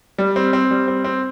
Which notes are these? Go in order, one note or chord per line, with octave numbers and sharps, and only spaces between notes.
G3
C4
C4
G3
C4
C4